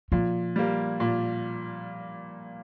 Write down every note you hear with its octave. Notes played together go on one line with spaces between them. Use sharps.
A#2 F3
G3 A#3
A#2